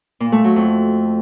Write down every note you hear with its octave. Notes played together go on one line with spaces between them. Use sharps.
A#2
A3
F#3
F2